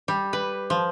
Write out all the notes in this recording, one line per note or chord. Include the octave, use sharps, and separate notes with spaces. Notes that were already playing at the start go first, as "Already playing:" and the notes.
G3
B4
F3